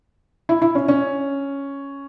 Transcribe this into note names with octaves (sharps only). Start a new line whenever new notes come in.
E4
E4
C#4
C#4